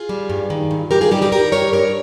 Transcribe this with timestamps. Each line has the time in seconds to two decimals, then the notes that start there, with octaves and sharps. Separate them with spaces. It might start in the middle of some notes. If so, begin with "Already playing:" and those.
Already playing: F4 G#4
0.09 G3
0.30 G2
0.50 D#3
0.71 G2
0.91 G2 G4 A#4
1.01 F4 G#4
1.11 G3 D#4 G4
1.22 D#4 G4
1.32 G3 G4 A#4
1.52 G2 A#4 C#5
1.73 G2 A#4 C#5